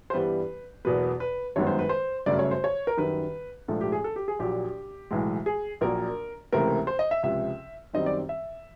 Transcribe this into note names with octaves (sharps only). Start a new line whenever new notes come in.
C5
G2 E3 G3 B3 B4
E2 B2 F#3 A#3 B4
B4
G1 F#2 D#3 G#3 B3 C#5
C5
B4
C5
G1 F#2 C#3 F#3 A3 D5
C#5
C5
C#5
A#4
F#2 D#3 G3 B4
A#1 G#2 F3 A3 A4
G4
G#4
A4
G4
G#4
A#1 A#2 F#3 G4
B1 A2 E3 G#3
G#4
A#1 A#2 F#3 A#3 A#4
C#2 C3 E3 A3 C4 A#4
C5
D#5
E5
C#2 C3 F3 E5
F#2 D#3 G3 C4 D#5
D5
E5